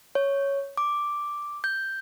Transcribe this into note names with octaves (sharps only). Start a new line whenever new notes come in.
C#5
D6
G6